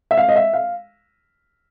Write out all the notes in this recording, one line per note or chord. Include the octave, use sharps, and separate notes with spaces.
E5
F5
D#5
E5
F5